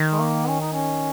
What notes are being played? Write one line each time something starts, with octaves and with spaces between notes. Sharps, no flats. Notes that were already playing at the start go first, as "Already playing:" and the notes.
Already playing: D#3
G#3
A#3
C#4
D#4
C#4